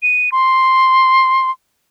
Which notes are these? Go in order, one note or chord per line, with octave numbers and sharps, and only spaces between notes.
D#7
C6